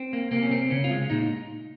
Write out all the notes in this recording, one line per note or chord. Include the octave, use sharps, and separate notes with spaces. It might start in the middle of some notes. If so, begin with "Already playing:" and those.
Already playing: C4
A#3
C3 A#3
C#4
C3 C4
C#3 C#4
F4
G#3
A#2 D#4